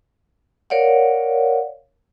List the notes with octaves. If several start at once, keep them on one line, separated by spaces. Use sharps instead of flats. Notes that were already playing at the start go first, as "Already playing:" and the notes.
A#4 C#5 D5 F5 F#5